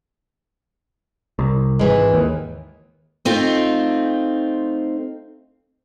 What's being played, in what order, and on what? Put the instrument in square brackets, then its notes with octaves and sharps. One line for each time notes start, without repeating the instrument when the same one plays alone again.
[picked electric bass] C2
[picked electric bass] G#1 [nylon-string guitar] E3 G#3
[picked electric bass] D#2
[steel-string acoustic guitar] A3 C4 D#4 F4